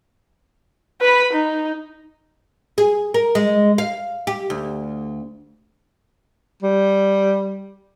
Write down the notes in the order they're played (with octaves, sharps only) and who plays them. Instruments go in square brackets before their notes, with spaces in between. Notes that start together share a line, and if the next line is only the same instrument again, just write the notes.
[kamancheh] B4 B5
D#4
[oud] G#4
A#4
G#3
F5
G4
D2
[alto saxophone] G3